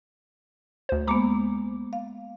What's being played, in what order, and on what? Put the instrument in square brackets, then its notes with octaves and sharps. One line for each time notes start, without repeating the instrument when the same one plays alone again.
[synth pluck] D2 C5
[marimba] G#3 A#3 B3 [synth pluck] A#5 D6
[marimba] F5